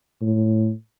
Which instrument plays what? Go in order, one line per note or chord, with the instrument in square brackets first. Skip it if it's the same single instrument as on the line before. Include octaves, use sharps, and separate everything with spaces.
[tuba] A2